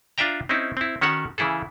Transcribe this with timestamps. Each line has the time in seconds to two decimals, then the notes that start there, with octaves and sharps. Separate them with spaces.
0.18 D4 F4 D5 E5 G5 A#5
0.49 C4 C#4 D#4 E4
0.77 C4 E4
1.01 D#3 C#4 F#4 A4 C#5 F#5
1.38 C#3 E3 E4 G#4 A4